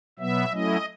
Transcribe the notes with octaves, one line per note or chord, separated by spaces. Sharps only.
B2 F#3 B3 E5
F#3 A3 C#4 E4 D#5